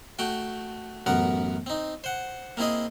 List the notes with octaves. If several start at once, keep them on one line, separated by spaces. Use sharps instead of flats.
A3 F#4 G5
A1 F#2 B3 A#4 F#5
C4 D#4
C5 F#5
A#3 C4 E4 G#4 D#5